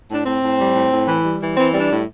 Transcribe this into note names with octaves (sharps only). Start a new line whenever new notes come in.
A2 D4
A2 C4
A2
G3
A2
A2
E3
G3
E3
E3 C4
G3 C4
D4
A2